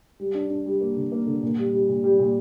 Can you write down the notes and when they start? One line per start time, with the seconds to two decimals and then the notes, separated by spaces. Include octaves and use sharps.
0.20 G3
0.34 D4
0.50 D4
0.66 G3
0.81 A#3
0.97 D3
1.12 A#3
1.27 D3
1.42 A#2
1.58 G3
1.73 G3
1.89 A#2
2.04 G3
2.19 A#2